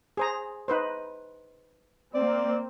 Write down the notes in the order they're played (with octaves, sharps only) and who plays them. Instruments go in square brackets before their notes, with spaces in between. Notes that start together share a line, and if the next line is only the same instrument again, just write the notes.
[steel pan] G#4 C5 A#5
D#4 B4 C5
[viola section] A#3 C4 [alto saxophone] D5